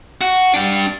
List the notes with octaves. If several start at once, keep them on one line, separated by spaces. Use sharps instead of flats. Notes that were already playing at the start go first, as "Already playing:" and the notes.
F#4
D4 G4